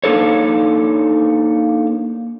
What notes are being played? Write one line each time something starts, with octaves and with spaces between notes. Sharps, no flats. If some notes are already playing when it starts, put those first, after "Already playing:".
A#3 D4 D#4 A4 C#5